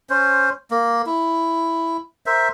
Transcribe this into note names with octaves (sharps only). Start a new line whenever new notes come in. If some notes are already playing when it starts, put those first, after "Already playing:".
C#4 C5
A#3
E4
A#4 C5 E5